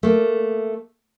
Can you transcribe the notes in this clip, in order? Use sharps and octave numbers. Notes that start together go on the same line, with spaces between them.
A3 A#3